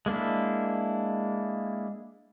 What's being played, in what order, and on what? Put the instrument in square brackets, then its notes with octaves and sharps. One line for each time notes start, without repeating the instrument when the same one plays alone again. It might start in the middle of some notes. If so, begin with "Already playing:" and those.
[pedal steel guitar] G#3 A#3 D4 E4